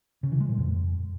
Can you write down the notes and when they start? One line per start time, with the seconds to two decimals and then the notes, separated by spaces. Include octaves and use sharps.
0.23 C#3
0.32 E3
0.40 G#3
0.49 A#2
0.58 F2